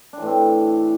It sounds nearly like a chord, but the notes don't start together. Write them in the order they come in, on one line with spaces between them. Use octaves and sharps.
D4 E3 A2 C4